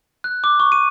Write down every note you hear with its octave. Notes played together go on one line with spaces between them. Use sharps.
F#6
D6
C#6
D#7